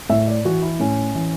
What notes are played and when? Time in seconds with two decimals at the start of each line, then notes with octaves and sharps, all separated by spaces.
0.10 A2 E5
0.27 D5
0.45 E3 F#4
0.62 E4
0.80 A2 C#4
1.15 E3